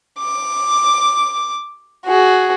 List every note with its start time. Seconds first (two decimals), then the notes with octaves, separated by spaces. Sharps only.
0.20 D6
2.06 F#4 G#4